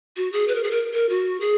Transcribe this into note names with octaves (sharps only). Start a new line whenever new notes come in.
F#4
G#4
B4
A#4
G#4
A#4
A#4
F#4
G#4